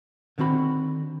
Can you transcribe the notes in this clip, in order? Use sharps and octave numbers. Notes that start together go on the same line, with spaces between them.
D3 D#3 C4 F#4 B5